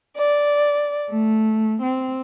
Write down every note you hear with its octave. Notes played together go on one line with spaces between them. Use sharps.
D5
A3
C4